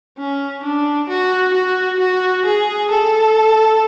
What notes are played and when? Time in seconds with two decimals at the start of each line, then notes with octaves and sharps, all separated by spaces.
0.18 C#4
0.63 D4
1.09 F#4
1.53 F#4
1.99 F#4
2.45 G#4
2.91 A4